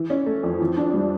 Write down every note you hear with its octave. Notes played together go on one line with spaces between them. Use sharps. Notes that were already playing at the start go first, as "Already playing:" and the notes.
Already playing: E3
C#4
A3
F2
E3
D4
G3